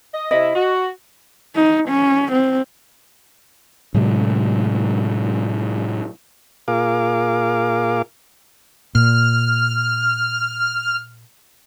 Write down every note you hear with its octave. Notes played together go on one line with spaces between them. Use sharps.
D#5
C3 E4 D#5
F#4
D#4
C#4
C4
A2 C3 F#3 G#3
A#2 F4 G#4 A#4 F5 D6
A#2 F6